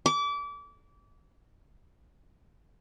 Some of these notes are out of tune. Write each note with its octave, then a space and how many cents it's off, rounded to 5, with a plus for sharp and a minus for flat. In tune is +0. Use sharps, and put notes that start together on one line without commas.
D6 -30